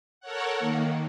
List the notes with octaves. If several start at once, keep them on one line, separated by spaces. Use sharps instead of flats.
A4 A#4 C#5 F#5
D#3 A#3